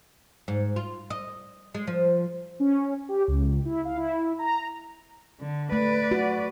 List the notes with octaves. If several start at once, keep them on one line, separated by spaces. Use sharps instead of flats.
G#2
F4
D#5
G#3
F3
C#4
G4
C#2
E4
F5
E4
A#5
D3
A3 B4 D5
F#4